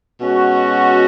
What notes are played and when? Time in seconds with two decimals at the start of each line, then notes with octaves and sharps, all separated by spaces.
0.20 B2 G#3 C#4 F#4